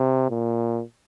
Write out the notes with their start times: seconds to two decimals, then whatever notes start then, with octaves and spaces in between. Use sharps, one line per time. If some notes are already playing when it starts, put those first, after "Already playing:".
Already playing: C3
0.30 A#2